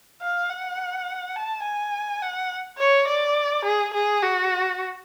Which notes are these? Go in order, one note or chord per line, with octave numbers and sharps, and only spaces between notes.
F5
F#5
A5
G#5
F#5
C#5
D5
G#4
G#4
F#4